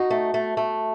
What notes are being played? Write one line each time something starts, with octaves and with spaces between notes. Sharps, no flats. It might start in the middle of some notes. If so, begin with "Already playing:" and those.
Already playing: D#4 F#4
A3
A3
A3